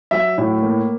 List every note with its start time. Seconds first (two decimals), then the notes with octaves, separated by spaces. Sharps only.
0.11 F#3 E5
0.38 A2
0.62 A#3